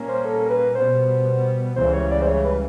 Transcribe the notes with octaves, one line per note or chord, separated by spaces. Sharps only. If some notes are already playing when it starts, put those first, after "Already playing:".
Already playing: A#2 G3 A#3 C#4
C5
A4
B4
B2 G3 B3 C5
C#2 C#3 E3 G3 C5
C#5
D5
C5
C#5
B4